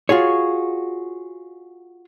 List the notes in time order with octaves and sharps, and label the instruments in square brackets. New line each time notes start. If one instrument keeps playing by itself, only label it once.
[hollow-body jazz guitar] F4 F#4 G#4 C#5